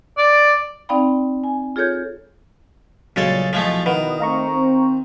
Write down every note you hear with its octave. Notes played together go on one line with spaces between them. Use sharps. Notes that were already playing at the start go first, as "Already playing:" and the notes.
D5
C4 D#4 D5 F5 G5 B5
G#5
F4 G#4 A4 C#5 G6 G#6
A#1 G2 A#2 C#3 F#3 G#3 A4 A6
B2 F3 G#3 A3 E4 D#5
D#3 B4 F#5
A3 C4 D#4 F5 A#5 C#6
C4